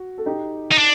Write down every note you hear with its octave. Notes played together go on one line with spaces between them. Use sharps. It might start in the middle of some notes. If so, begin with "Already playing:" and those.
Already playing: F#4
A4
D#4 G4
D#4
D4